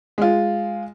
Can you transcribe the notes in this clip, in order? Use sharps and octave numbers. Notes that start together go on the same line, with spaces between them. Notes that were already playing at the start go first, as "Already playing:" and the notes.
G#3 F4